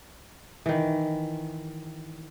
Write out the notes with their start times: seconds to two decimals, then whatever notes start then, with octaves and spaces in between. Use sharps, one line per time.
0.66 D#3 E3